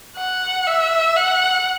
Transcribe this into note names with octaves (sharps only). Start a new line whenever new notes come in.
F#5
E5
F#5